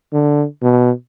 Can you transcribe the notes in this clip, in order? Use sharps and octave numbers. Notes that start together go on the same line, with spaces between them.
D3
B2